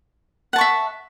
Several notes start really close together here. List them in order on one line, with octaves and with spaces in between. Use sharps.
F#5 A5 C#6 E5